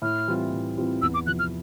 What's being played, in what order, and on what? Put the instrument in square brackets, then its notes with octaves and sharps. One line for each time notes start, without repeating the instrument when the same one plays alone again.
[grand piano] A2 [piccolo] F6
[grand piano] E3 G3 C4 F4
A2
E3 G3 C4 F4
[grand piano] E2 [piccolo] E6
[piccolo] D6
[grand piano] C3 F3 [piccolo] F#6
[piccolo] F6